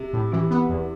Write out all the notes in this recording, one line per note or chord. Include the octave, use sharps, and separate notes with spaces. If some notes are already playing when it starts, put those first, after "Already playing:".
Already playing: C3
A2
C3 E3
B3
E2